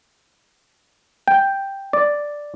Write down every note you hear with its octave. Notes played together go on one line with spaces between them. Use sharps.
G5
D5